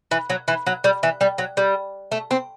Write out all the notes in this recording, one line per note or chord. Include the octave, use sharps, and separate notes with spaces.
E3
F#3
E3
F#3
G3
E3
G3
F#3
G3
A3
C4